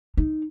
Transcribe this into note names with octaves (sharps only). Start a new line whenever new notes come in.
D#4